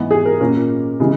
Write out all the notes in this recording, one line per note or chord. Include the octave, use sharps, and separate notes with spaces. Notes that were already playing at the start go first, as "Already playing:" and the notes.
Already playing: G#2 E3 B3
G#4
A#4
A#2 A#3 C#4 A#4
C#3 E3 G#3